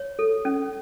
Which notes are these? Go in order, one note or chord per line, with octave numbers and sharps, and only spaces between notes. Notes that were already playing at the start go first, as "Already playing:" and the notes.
Already playing: C#5
A4
C#4